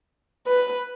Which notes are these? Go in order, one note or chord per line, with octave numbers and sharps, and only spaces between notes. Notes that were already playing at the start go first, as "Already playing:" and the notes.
B4